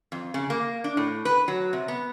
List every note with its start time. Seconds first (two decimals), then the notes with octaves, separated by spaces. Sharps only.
0.12 F2
0.34 C#3
0.50 A#3
0.84 D4
0.97 A2
1.25 B4
1.48 F#3
1.73 C3
1.88 B3